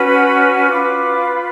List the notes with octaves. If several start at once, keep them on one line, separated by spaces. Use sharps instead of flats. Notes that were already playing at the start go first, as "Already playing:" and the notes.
Already playing: C#4 F#4 B4 B5
F4 B4 D6